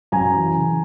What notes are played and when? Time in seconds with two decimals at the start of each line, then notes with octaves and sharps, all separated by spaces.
0.12 F#2 G#5 A#5
0.34 E3
0.56 C#3